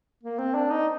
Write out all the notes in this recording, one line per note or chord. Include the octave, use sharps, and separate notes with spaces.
A#3
C4
D4
D#4